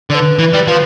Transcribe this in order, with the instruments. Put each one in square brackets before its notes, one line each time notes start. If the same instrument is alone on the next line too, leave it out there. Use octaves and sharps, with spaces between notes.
[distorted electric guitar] D3 [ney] D5
[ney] B4
[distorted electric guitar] E3
G3
[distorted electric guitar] F3 [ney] B4